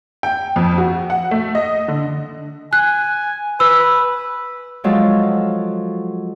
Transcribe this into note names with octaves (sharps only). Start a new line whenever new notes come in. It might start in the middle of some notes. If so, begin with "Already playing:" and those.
G5
F2
F#4
F#5
A3
D#5
D3
G#5 F#6
B4 E6
F3 F#3 G#3 F4 A4